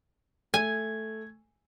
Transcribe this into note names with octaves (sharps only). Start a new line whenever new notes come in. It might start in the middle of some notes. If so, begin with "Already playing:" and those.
A3 G#5 G#6